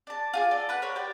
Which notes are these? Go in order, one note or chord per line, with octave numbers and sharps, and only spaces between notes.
D4 A5
F4 G#4 D6
A4 D5
B4 F#5 F#6
A#4 C5 C#5 B5
G4 D5 G5